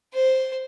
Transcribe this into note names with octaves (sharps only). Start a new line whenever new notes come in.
C5